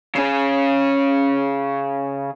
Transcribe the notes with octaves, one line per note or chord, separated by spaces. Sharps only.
C#3 C#4